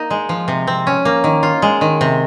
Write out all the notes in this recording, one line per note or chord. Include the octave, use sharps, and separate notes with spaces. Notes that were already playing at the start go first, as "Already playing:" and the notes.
Already playing: A#3 D#4
G#3
F3
C3
C4
C#4
A#3
D#3
F4
G#3
D#3
C3